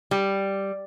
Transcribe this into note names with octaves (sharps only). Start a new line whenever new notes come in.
G3